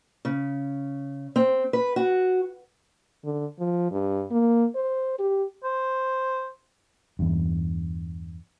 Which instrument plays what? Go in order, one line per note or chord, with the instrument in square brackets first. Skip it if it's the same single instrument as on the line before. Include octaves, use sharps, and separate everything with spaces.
[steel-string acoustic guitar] C#3
C4
B4
F#4
[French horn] D3
F3
G2
A#3
C5
G4
[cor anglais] C5
[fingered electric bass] E2 G2